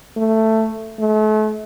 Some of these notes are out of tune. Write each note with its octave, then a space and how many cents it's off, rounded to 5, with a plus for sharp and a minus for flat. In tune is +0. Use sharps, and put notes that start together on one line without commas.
A3 +10
A3 -40